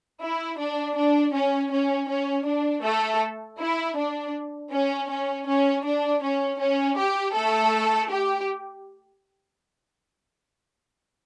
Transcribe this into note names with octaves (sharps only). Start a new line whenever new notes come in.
E4
D4
D4
C#4
C#4
C#4
D4
A3 A4
E4
D4
C#4
C#4
C#4
D4
C#4
C#4
G4
A3 A4
G4